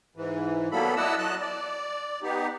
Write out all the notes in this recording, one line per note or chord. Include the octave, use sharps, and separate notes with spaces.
G#2 E3
F#3 G3 A#3 B3 A4 B5
E4 D5 D#5 F#5 A5 E6
F#3 D#5 A5 F#6
D5
B3 D#4 G4